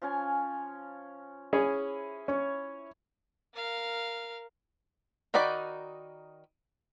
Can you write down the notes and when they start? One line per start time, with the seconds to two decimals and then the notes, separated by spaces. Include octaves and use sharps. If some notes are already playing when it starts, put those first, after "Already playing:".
0.02 F3 C#4 G#5
1.53 C#4 E4 G#4 C#5
2.28 C#4 C#5
3.55 A#4 F5
5.34 D#3 D#4 F#4 D5 B5